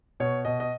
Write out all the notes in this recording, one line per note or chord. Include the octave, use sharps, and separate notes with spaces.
B2 C#5
B2 D#5
D#5